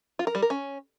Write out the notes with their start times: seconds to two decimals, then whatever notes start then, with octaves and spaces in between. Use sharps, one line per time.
0.19 F4
0.27 A#4
0.35 G3
0.42 A#4
0.50 C#4